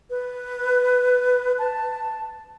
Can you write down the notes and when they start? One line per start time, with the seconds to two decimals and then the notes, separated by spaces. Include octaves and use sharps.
0.10 B4
1.59 A5